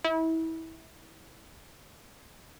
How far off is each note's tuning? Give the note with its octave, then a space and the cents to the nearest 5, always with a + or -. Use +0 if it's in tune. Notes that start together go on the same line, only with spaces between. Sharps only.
E4 -25